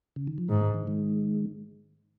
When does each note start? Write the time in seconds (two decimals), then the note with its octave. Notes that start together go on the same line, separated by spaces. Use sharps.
0.16 C#3
0.27 D#3
0.38 F3
0.48 G#2 D#3 G#3
0.61 D#3
0.74 D#3
0.87 D#3 G#3